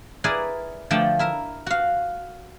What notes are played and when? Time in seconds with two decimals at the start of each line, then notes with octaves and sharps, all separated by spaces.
0.24 E4 G#4 A#4 B4 D5
0.90 D3 F3 A3 D5 G5 A5
1.19 E4 A#4 E5
1.67 F#4 F5